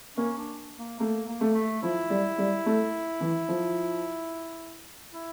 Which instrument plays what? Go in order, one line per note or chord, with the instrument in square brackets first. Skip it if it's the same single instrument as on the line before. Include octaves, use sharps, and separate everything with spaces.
[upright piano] A#3 [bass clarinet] C#4
[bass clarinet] D4
A#3
[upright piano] A3 [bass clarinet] A#3
[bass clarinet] A#3
[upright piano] A3
[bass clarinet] A3
[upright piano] F3 [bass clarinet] E4
[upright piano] G3
G3
A3
E3
F3
[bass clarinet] E4